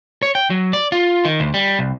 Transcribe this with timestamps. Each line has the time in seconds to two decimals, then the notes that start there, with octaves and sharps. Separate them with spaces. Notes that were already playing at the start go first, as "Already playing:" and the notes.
0.22 C#5
0.35 G5
0.50 F#3
0.73 D5
0.92 F4
1.25 D#3
1.40 D2
1.54 G3
1.79 C2